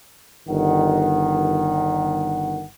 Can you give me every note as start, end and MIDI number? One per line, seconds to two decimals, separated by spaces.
0.48 2.64 31
0.48 2.64 51
0.48 2.64 78